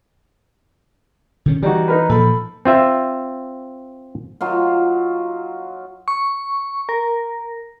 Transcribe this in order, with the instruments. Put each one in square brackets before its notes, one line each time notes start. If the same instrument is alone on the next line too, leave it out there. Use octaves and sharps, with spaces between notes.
[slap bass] D3 D#3 C#4
[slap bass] E3 [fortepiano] G3 D#4 F#4
[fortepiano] D#4 A#4 B4
[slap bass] A#2 F3 [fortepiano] A4 B5
[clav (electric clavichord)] C4 F4 E5
[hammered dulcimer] F#3 D#4 F4
[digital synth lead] C#6
A#4